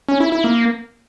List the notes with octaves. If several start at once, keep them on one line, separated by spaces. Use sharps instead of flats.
C#4
E4
E4
A#3